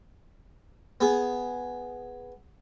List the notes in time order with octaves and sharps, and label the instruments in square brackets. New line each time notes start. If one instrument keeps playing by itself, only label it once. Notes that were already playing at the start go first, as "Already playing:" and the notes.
[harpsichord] B3 G#4